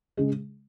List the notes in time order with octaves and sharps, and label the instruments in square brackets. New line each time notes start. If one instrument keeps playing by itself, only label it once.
[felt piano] C#3 G#3